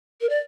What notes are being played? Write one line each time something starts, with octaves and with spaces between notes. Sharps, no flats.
A#4
D5